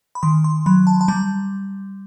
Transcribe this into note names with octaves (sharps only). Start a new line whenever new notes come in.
B5
D#3 C6
C6
F#3 B5
A5
A5
G3 A#5